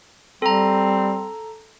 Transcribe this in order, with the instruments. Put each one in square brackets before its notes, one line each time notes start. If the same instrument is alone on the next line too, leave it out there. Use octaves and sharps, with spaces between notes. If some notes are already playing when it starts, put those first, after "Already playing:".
[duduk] G3 [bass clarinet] C4 [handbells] A4 A#5